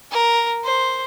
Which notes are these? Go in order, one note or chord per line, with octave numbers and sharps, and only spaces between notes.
A#4
C5